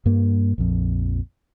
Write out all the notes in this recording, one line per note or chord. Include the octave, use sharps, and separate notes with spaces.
G2 A#3
A#1 F2